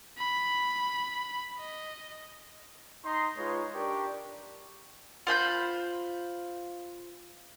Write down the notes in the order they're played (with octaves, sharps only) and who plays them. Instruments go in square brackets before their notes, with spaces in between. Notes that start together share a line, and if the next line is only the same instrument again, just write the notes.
[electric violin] B5
D#5
[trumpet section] D#4 D#5 A#5 C6
G#3 D#4 F4 B4 C#5
D4 G4 A#4 D5 C#6
[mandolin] F4 C5 B5 G6